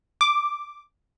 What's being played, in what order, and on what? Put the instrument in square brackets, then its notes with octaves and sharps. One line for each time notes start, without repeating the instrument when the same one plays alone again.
[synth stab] D6